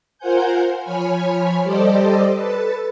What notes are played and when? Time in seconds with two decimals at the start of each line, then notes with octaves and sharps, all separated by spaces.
0.18 F4 A#4 C5 F#5 G#5 G6
0.82 F3 C#5 G#5 B5 F6
1.63 G3 G4 A4 C5 D5 D#5
2.33 A4 B4 A5